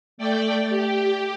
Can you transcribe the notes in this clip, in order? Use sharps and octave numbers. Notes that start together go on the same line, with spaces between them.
A3 D5 G5
G4